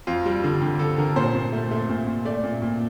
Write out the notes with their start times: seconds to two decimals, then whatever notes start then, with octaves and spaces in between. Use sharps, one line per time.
0.07 F2 F4
0.25 G3
0.44 D3
0.61 D3 G4
0.79 D3 A4
0.98 D3 A#4
1.16 A#2 C5
1.35 A#2
1.52 A3
1.71 A3
1.89 A#2
2.07 A#2
2.25 A3 D5
2.44 A#2
2.62 A#2